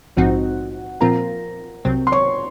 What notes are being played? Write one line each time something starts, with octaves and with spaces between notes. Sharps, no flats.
A#1 G#2 F3 C4 D#4 F#4 F#5
A#2 F3 C4 F4 A#4 A#5
C2 C3 F#3 C4
C6
C#5 C#6